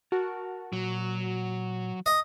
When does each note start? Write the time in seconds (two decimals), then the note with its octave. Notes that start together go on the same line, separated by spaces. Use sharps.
0.12 F#4 A#4 A5
0.73 A#2 F#3
2.06 D#5